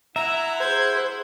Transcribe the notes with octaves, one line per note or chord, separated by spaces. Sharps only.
E4 E5 F#5 A#5
G#4 C5 G#6